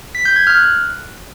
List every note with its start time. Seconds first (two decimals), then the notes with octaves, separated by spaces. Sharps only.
0.15 B6
0.25 G6
0.36 G#6
0.47 F6
0.58 F#6